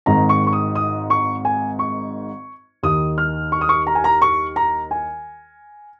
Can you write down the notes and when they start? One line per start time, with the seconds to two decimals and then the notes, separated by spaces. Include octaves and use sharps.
0.06 G#1 G#2 D#3 A#5
0.29 C#6
0.47 C#6
0.53 D#6
0.75 D#6
1.10 C#6
1.45 G#5
1.79 C#6
2.83 D#2 D#3 D#6
3.18 F6
3.52 C#6
3.61 D#6
3.69 C#6
3.87 A#5
3.95 G#5
4.04 A#5
4.22 C#6
4.56 A#5
4.91 G#5